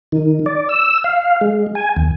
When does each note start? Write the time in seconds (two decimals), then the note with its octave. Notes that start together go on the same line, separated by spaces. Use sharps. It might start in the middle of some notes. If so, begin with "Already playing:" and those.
0.12 D#3
0.46 D5
0.69 E6
1.04 F5
1.41 G#3
1.75 G#5
1.96 D#2